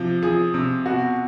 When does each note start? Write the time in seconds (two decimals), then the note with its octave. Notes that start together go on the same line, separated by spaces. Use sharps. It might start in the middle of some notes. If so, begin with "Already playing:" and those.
Already playing: C3 F3
0.23 F3 G#4
0.54 C3
0.86 B2 F#4